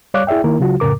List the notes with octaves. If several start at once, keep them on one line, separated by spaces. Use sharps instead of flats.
G3 C#5 D5 F5 D6 F#6
E4 G#4 D5 E5 G5
D#3 A#3 E4 A#4
C#3 F#3 F4 F#4
F2 A2 C#3 A#4 D6